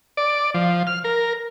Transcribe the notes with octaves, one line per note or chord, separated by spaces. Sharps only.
D5
F3
F6
A#4